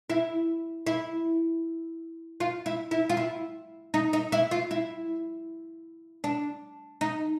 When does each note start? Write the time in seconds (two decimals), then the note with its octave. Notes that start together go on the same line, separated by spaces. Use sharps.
0.10 E4
0.86 E4
2.40 F4
2.66 E4
2.91 E4
3.09 F4
3.17 E4
3.94 D#4
4.13 D#4
4.32 E4
4.51 F4
4.71 E4
6.24 D4
7.01 D#4